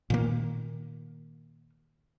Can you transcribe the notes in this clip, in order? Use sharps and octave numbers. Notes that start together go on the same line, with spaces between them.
A#2 D#3 A#3